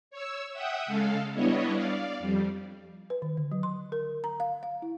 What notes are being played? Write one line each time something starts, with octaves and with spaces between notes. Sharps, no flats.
C#5 E6
E5 F#5 G5 D#6
C#3 G#3 A4 F5
G3 B3 D4 E4 C#5 D#5
D5 F5
F2 G3
B4
D#3
D3
F#3
C6
A#4
A#5
F5
F5
E4